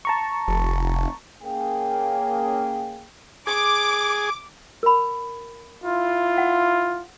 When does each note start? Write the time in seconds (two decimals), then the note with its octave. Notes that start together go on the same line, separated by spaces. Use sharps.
0.05 A5 A#5 C#6
0.48 F1
1.43 A#3 C#4 G#4 G5
3.47 G#4 D6
4.83 A#4 B5
5.84 E4 F4
6.38 F#5